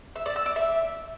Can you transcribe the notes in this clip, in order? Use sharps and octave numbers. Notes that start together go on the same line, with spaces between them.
E5
D5
E6
D5
E5